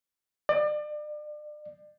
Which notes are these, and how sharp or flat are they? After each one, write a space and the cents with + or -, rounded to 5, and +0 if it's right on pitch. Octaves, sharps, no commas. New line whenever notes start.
D5 +35